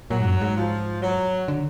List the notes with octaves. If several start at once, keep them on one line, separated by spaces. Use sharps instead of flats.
A#2 F#3
G#2
F#2
G#2
F3
F#3
D3